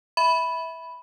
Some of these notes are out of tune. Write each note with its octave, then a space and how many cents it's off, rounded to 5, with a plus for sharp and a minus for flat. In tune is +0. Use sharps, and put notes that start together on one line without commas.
E5 -15 B5 +0